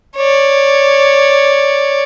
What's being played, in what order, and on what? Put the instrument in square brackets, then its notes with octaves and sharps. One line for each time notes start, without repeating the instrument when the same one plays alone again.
[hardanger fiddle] C#5 D5